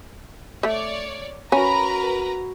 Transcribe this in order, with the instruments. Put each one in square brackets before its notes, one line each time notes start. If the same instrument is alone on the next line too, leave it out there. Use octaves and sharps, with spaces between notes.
[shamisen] A3 E5 [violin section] C#5 D5
[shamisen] C#4 [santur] F#4 B5 [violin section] A#4 B4 A#5